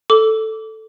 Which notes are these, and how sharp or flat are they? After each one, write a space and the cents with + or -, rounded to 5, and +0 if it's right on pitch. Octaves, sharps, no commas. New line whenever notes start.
A4 +0 D6 -25